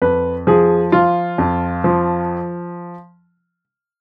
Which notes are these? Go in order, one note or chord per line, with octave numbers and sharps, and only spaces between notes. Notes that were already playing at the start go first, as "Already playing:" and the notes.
F2 B4
F3 G#4
F3 F4
F2
F3